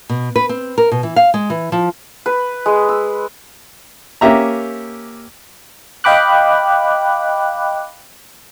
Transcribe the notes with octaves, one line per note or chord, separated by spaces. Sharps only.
B2
B4
C4
A#4
B2
E3
F5
G#3
E3
F3
B4
G#3
E6
A#3 C#4 G4 E5 A#5
D#5 F5 G5 B5 D6 F#6